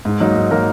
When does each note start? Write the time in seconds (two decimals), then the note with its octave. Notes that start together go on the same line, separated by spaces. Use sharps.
0.05 G#2
0.20 F#3 A#3 D#4 A#4
0.36 G#2
0.51 F#3 A#3 D#4 A#4